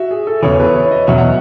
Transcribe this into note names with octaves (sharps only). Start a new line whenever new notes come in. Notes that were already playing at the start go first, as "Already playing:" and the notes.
Already playing: F#4 E5
G#4
A4
E2 C#3 E3 C#5
B4
C#5
D#5
E2 B2 F#3 C#4 E5
F#5